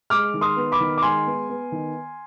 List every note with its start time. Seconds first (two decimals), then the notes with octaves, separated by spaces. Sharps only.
0.10 G#3 D6 F6
0.34 D#3
0.41 C6 D#6
0.57 B3
0.72 B5 D6
0.80 D#3
0.98 D6
1.02 G#3 G#5 C6
1.26 B3
1.49 B3
1.72 D#3